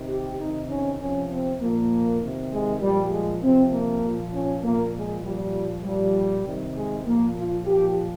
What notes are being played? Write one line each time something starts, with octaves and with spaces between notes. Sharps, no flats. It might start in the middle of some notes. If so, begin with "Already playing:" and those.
Already playing: C3 D#3
G4
C3 D#3 D#4
C#4
C3 F3 C#4
C4
A#2 F3 A#3
C3 D#3
G#3
A#2 F3 G3
G#3
C3 F3 C4
A#3
A#2
F3
C#4
A#2 F3 A#3
G#3
A#2 F3 G3
A#2 F3 G3
C3 D#3
G#3
A#2 F3 A#3
F4
A#2 F3 G4